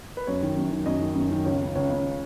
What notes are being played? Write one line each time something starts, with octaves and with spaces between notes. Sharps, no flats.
B4
F#2 C#5
D#3
F#2
D#3
F#2 D#5
D#3
F#2
D#3
C#2 C#5
C#3
C#2 C#5
C#3